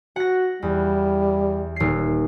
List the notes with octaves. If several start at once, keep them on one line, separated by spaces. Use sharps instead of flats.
F#4 F#5 A#6
E2 G3
D#1 C7